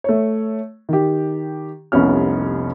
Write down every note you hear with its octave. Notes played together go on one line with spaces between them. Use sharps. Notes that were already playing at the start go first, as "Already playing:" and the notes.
A3 C#5
D#3 G4
F1 C2 B3 C#4 F6